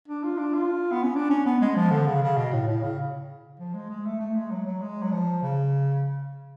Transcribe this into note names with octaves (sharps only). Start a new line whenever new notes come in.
D4
F4
D4
F4
B3
C#4
D4
C#4
B3
G#3
F3
D3
C#3
C#3
B2
A2
A2
C#3
F3
G#3
G#3
A3
A3
G#3
F#3
F#3
G#3
F#3
F3
C#3